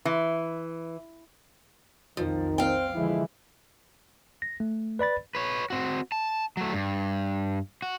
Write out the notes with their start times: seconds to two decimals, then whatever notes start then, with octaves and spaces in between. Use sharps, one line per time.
0.05 E3
2.17 B1 F2 D#3 F3
2.58 C4 F5 G5
2.95 D3 E3 F3 G#3 E4
4.42 A#6
4.60 A3
4.99 B4 D5 B5 A6
5.35 B4 C#5
5.70 C4 F#4
6.12 A5
6.57 F#3 A3
6.73 G2
7.82 F#4